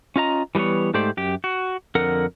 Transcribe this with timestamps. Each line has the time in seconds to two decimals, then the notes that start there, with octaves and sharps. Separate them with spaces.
0.16 C#4 F4 D#5 A#5
0.55 E3 G3 G#3 B3 C#5
0.94 G#2 A3 G4 C5 D5
1.17 F#2 G4
1.44 F#4
1.95 F2 D3 A#4 F#5